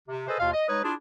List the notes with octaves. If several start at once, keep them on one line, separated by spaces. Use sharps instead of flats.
C3
G#4 A4 B4 C5 D#5
D#2 B2 F4 F5
D#5
G#3 D#4 B4 C#5 D#6
D4 E4 F4 G#4